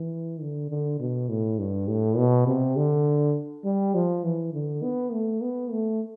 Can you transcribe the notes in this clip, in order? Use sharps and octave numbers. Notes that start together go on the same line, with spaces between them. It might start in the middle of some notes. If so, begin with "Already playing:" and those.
Already playing: E3
D3
D3
B2
A2
G2
A2
B2
C3
D3
G3
F3
E3
D3
B3
A3
B3
A3